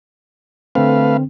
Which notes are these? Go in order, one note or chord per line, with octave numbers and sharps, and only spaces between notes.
D3 A3 C4 B4 F5